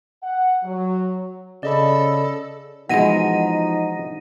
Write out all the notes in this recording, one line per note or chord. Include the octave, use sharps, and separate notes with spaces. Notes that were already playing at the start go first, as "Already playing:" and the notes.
F#5
F#3
C#3 A4 D5 D#5 B5
B2 E3 F3 G#3 D#4 F#5 A#6 D#7